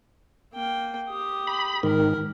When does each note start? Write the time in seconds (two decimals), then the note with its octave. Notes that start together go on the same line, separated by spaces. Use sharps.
0.53 A#3 G5
1.09 G4 D#6
1.47 B5
1.83 G#2 D#3 A#4